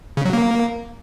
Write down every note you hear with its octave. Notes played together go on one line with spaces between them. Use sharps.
C#3
F#3
A#3